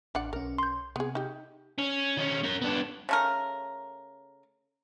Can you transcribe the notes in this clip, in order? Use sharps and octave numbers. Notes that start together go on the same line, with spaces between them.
A1 D4 D5 F#5
B1 C#4 A#4
C6 G6
C3 B3 G#4
D#4 G4
C#4
D#3 C#4
C#4 A#4
B3 D4
C#3 A3 A#4